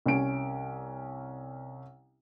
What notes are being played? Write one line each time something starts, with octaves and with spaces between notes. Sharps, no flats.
C2 C#4 D7